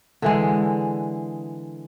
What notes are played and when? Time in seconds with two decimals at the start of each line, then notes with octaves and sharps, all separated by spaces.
0.22 D3 E3 G#3